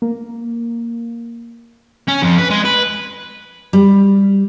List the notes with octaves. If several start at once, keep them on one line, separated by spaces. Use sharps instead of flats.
A#3
C#4
F2
B4
G#3
B4
G3